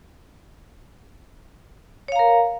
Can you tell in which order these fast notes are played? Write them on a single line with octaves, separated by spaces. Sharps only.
C#5 F5 A#5 A#4